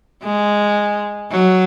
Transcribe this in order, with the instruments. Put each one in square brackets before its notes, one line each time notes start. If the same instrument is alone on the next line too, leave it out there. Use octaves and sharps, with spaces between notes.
[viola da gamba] G#3
F#3